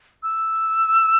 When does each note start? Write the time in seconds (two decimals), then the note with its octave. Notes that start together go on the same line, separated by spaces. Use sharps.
0.23 E6